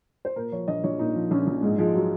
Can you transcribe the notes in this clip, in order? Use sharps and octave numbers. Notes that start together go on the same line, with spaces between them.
C5
A#2 A#4
F3 C#5
A#1 D#5
A#1 C#5
A#2 D#4
F3
A#1 C#4
A#1
G#2 G#3
F3 G#3
F#3